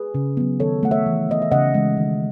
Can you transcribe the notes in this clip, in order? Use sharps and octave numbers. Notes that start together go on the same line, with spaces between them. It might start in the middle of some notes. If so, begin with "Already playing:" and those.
Already playing: G#4 B4
C#3
F#3 B3
D#3 A4 C#5
A3 F#5
C#5 E5
E3
B3 D#5
E5
C#3 D#5 F#5
E3 G#3
D#3